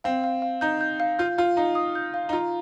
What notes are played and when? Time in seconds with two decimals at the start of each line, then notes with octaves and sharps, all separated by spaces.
0.04 C4 F5
0.24 F5
0.42 F5
0.61 D#4 G6
0.81 G6
1.00 F5
1.19 F4 G6
1.38 F4 F5
1.57 D#4 F5
1.75 D#6
1.95 G6
2.14 F5
2.29 D#4
2.33 F4 A#5